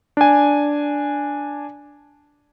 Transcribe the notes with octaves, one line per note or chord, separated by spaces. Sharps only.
D4 G#5